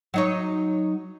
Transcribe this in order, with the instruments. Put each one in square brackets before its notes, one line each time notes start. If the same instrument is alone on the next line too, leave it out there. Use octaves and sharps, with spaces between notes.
[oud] F#3 D#4 C#5